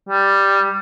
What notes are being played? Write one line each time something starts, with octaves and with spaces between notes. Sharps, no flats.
G3